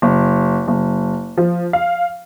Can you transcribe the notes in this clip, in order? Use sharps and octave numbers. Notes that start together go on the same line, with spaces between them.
F#1
F#1
F3
F5